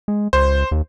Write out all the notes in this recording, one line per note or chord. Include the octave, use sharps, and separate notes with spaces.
G#3
C#2 C5
D#2